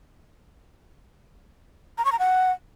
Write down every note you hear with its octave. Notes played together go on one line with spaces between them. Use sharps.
A#5
C#6
A#5
F#5